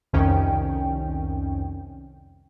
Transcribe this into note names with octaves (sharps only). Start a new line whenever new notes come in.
C2 F2 D#3 C#4 G5